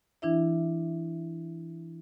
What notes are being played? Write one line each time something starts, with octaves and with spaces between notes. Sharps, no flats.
E3 D4 E4 E5